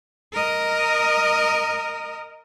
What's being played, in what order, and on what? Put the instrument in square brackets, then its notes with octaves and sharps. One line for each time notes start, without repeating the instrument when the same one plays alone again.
[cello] A#4 D#5